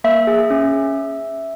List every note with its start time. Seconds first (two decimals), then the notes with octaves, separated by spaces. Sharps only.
0.04 A#3 E5
0.27 G#4
0.50 C#4